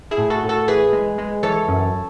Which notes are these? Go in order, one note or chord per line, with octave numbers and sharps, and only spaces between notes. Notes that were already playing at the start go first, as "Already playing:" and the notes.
E4 G#4
A2
F#4 A4
A2
F#4 A4
E3 G#4 B4
G#3
G#3
E3 A4 C#5
F#2